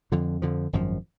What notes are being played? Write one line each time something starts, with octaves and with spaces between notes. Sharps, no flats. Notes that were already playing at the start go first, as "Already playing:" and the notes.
F2 D3 F3
F2 D3 F3
G#1 F#2 F3